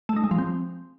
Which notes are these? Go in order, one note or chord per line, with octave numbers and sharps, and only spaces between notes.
A3
D#4
G#3
F3
C4